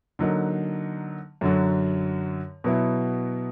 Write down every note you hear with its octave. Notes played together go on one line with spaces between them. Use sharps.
D3 F#3 A#3 D#4
F#2 D3 F#3
B2 F#3 B3 E4